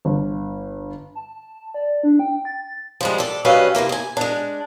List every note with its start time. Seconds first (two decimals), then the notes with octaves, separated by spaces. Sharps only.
0.05 G1
1.15 A5
1.74 D5
2.03 D4
2.19 G5
2.45 A6
3.01 F3 G3 G#3
3.18 A4 D5
3.45 F#3 G3 C#4 B4 D#5 F5
3.75 C3 D#3 A#3 E4
3.89 D#5 G#5
4.17 G#3 D4